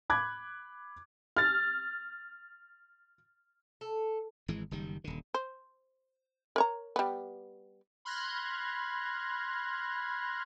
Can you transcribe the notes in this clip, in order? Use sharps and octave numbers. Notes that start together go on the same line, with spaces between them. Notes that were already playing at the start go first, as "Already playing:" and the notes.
B5 D6 F#6 G#6
F6 A6
A4
G#1 E3 G#3
F#1 D#3 G3
D#1 D3
C5
A#4 C#5 A#5
G3 B3
B5 C6 F6 F#6 G#6 A#6